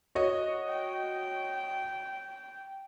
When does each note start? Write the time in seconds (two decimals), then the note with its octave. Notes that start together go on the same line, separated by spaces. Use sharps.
0.15 F#4 C#5 D#5
0.68 G5